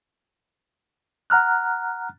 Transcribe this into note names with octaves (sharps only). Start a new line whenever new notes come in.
F#5 A#5 F6 F#6